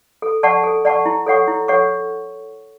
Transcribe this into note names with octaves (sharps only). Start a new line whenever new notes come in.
A4
D5 F#5 A5 C#6
A4
D5 F#5 A5 C#6
E4
A4 C#5 F#5 C#6
E4
A4 C#5 F#5 C#6